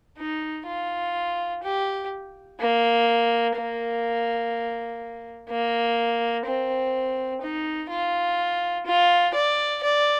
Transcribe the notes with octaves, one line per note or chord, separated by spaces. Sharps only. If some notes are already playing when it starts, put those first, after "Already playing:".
D#4
F4
G4
A#3
A#3
A#3
C4
D#4
F4
F4
D5
D5